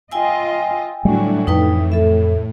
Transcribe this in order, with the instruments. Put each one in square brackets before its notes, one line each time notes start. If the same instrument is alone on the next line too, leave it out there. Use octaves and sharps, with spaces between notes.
[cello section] F4 D#5 [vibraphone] G5 G#5 E6
[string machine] A2 [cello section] D3 D4 F#4 [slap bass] F#3 G3 A3
[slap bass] F2 [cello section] E3 [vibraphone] D#4 B4 G5
[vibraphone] A4 E5